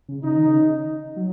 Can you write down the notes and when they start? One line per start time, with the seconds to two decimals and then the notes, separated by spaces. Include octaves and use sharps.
0.09 C#3
0.23 C#3 D#4
0.36 D#3
0.46 C#3
1.16 F#3